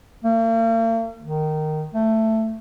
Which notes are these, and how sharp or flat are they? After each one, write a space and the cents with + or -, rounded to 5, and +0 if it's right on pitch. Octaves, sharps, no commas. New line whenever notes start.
A#3 -45
D#3 -15
A3 +10